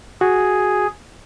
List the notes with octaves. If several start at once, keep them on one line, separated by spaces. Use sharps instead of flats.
F#4 G#4